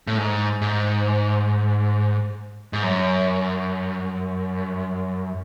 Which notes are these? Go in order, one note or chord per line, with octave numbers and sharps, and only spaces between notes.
A2
G#2
G#2
G#2
F#2